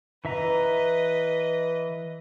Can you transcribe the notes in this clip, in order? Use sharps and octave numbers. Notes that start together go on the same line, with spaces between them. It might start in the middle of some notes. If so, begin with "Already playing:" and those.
E3 B4 D#5 E5 A#5